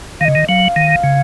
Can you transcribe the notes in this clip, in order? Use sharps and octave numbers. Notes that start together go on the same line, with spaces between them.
D#3 F5
C#3 D#5
D#3
F#3 F5
D#3
C#3